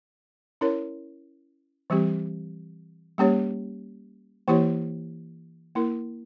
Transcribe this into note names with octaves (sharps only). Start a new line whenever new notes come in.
C#4 E4 A#4 C#5
E3 G3 C4 G4
G3 A#3 C#4 G4 C#5
E3 A#3 E4 G4 C#5
A#3 E4 A#4